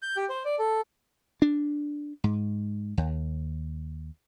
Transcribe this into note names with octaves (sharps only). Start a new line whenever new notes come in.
G6
G4
C5
D5
A4
D4
G#2
D#2